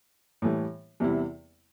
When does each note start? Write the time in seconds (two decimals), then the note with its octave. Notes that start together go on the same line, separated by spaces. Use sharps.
0.42 A2 E3 G3
1.00 E2 C3 G3 E4